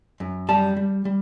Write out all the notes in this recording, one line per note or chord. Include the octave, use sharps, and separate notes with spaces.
F#2
G3 A5
G3
G3